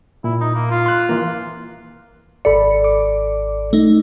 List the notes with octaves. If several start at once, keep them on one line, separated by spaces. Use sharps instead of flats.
A#2 E4
D#4
A#3
F4
C6 F#6
E3 A#3
G#1 A4 D5 B5 C#7
D6
A3 D#4